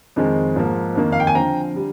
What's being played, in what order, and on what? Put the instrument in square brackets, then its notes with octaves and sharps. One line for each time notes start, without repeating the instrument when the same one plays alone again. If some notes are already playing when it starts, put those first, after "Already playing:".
[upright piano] F2 D#3 G#3 C4
G#2 F3 A#3
F2 D#3 A#3
F5
G5
G#5
D3 F3 C4 G5 A#5
D3 G3